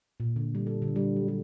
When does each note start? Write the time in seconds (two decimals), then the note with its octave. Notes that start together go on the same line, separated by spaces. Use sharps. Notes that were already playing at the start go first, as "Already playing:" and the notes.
0.20 A#2
0.36 D3
0.55 G3
0.67 A4
0.82 D3
0.96 G3
1.16 F#3
1.28 G3